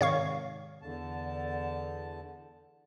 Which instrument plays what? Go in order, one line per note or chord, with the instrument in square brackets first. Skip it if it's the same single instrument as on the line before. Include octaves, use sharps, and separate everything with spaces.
[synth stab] G#2 C3 D#3 [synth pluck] C#5 F5 C#6
[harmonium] E2 D3 A5